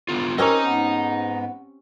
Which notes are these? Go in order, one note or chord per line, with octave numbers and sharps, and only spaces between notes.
D3 B3 F4
C4 C#4 G4 A#4 D#5 A#5
G#2 B3